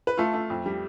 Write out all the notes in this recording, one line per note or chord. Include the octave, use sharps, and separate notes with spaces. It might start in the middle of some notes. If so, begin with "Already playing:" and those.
B4
A3 F4 A4
A3
F2
G3